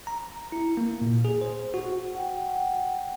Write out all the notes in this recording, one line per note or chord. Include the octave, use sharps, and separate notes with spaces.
A#5
E4
A#3
A#2
G#4
C5
F#4
F#5 G5